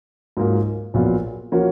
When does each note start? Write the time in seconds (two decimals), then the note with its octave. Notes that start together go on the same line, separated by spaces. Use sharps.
0.37 G#2 F#3 A#3 F4
0.94 A#1 A#2 F#3 B3 F4
1.52 F3 A#3 C#4 F#4